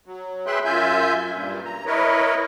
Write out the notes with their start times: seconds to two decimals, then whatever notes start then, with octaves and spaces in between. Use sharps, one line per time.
0.06 F#3
0.46 G#4 B4 E5 G5 C6 F#6
0.65 F#2 F4 E5 G#5 G6
1.32 G2 A#2
1.65 A#5
1.86 E4 A#4 B4 C#5 D#5